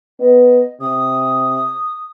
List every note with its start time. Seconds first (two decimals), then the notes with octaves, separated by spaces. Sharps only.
0.20 B3 D#5
0.81 C3 D#6